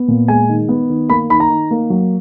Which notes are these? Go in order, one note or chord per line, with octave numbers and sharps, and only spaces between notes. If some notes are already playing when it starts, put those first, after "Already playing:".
Already playing: B3
A#2
G#3 G#5
D#3
B3
D#3
A#3 B5
D#3 B5
A#5
D#3
A#3
F#3